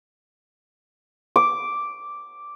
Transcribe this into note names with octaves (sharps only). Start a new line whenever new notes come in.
D6